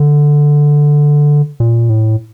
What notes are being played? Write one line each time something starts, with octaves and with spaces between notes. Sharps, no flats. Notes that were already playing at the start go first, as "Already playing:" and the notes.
Already playing: D3
A#2
A2